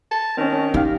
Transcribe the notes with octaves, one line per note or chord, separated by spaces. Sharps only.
A5
D#3 C4 C#4
C#4
D#4 G4 F5